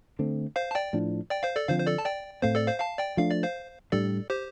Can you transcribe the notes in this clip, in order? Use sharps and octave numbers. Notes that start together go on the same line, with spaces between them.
D3 A3 C4
C5 F5
A5
D5 G5
A2 F3 D4
D5 G5
C5 F5
A4 D5
D3 F3 C4 C5 F5
C5
A4 D5
A5
D5 G5
A2 A3 C4 C5 F5
A4 D5
C5 F5
F5 A5
D5 G5
F3 A3 D4 F5
D5
C5 F5
A2 G3 D4 A4 D5
G4 C5